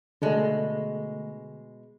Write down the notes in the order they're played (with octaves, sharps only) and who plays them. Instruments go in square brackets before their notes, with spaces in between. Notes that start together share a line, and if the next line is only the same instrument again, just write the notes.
[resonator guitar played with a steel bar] B2 G#3 [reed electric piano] D3 A3